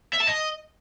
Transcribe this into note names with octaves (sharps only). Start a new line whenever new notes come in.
E5
A5
D#5